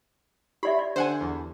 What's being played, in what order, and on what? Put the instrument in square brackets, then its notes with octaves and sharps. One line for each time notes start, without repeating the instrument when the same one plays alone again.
[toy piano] G4 D5 E5 [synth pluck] B5
[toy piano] D5
[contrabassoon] D3 [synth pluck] C5 F#5 G#5
[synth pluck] E2